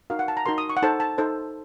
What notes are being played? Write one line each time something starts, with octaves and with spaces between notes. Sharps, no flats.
D#4 F#4 A#4 F5
F#5
A5
A#5
D#4 F#4 A#4 C6
D#6
C#6
F#5
D#4 A4 C5 A5
A5
D#4 A4 C5